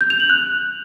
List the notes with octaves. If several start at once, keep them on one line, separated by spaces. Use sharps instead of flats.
G6
F7
F#7
F#6